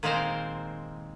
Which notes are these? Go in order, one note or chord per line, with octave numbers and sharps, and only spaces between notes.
A#2 D#3 G#3 C4 A#4 C5